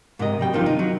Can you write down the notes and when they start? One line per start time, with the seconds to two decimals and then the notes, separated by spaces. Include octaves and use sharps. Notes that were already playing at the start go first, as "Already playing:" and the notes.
0.19 G#2 C3 A#4 D#5
0.39 F#3 G3 G5
0.53 G2 C3 D#3 F3 D4 F4
0.66 D#4
0.79 F#3